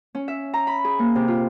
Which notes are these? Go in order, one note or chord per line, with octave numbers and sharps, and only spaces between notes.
C#4
E5
A#5
B5
G#4
A#3
C3
F4